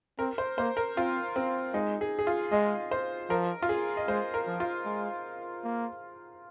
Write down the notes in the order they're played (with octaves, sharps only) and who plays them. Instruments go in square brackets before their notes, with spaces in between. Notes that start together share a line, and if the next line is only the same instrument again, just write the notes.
[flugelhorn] C4 [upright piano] A#4
[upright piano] C5
[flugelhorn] A#3 [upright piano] C5
[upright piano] A#4
[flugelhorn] C4 [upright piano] F4
[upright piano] C4
[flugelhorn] G#3 [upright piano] D#4
[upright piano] G#4
G#4
F4
[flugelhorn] G#3 [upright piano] D#5
[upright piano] C5
[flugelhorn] F3 [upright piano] A#4
[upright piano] F4
G#4
D#5
[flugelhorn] G#3 [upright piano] C5
[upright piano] A#4
[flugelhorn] F3
[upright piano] F4
[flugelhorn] G#3
A#3